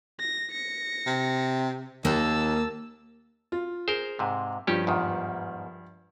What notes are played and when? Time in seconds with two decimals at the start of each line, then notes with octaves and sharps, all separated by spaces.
0.20 A#6
0.51 A#6 C#7
1.07 C3
2.05 D#2 A#3 A5 E6
3.52 F4
3.88 G#4 A#4 C5
4.19 G#2 C3
4.67 G2 F3 C#4 G4
4.87 E2 G#2 D#3